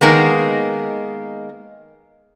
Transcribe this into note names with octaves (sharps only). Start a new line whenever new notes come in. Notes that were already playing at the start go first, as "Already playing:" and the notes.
D#3 G#3 A#3 B3